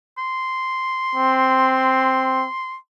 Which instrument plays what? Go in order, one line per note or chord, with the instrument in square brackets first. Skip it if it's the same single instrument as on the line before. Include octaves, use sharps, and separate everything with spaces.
[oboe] C6
[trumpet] C4